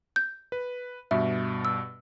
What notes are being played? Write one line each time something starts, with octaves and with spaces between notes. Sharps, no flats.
G6
B4
G2 B2 E5
E6